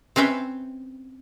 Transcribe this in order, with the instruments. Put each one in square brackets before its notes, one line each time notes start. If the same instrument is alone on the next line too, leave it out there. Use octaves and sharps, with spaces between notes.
[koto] C4 C#4 B4 E5 G5